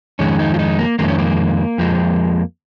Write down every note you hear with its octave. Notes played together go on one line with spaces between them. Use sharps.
F2 D#3 G#3 C#4
D#4
F4
D#4
A#3
F2 D#3 G#3 A#3
C#4
A#3
F2 F3 G#3